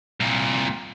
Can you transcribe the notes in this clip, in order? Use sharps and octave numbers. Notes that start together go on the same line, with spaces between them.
C2 A#2